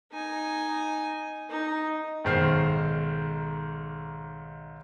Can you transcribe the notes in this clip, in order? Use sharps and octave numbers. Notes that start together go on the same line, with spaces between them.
D#4 G#5
D#4
B1 G#2 D#3 C5 F6 C7